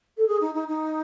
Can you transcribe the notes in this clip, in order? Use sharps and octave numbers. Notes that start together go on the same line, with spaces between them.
A4
G#4
D#4
D#4
D#4